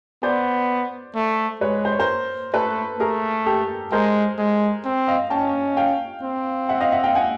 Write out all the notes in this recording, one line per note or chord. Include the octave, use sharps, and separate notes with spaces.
B3 C5 D5
A3
G#3 B4 C#5
C5
C#5
A#4 C5
A3 A4 B4
A3 G#4 A#4
G4 A4
G#3 A#4 C5
G#3
C4
D#5 F5
C#4 G5 A5
F5 G5
C4
E5 F#5
D#5 F5
E5 F#5
F5 G5
F#5 G#5